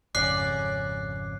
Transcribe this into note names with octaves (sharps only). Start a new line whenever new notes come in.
G#1 F2 C#3 C#4 D5 D6 F#6 C7